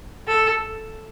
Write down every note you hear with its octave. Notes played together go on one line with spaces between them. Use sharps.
A4